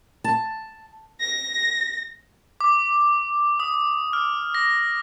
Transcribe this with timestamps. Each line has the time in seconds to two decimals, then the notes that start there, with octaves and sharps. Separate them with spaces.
0.24 A5
1.20 A#6
2.61 D6
3.60 D#6
4.13 F6
4.55 A#6